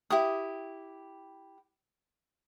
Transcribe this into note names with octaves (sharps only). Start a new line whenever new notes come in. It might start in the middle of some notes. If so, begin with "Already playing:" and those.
E4 G4 D6 D#6